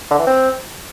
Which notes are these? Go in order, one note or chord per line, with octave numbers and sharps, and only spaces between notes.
D3
E3
C4